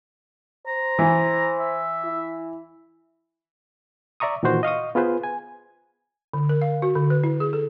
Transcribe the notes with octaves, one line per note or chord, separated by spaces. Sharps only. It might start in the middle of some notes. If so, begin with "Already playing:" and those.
C5 A#5
E3
E5
E4
D5 E5 A#5 C#6 D#6
A#2 D#3 E3 F#4 C5
D#5 F5 C#6 D#6
B3 F4 G#4 B4 C5
G#5
D3
A#4
F5
F#4
D3
B4
E4
G#4
A4